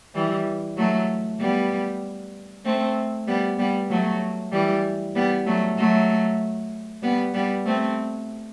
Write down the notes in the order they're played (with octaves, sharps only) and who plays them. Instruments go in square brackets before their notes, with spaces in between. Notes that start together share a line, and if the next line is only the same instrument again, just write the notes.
[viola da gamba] E3 G3
F#3 A3
G3 B3
A3 C4
G3 B3
G3 B3
F#3 A3
E3 G3
G3 B3
F#3 A3
F#3 A3
G3 B3
G3 B3
A3 C4